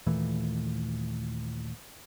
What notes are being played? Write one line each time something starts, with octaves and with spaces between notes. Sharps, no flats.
D#2 A#2 E3 A3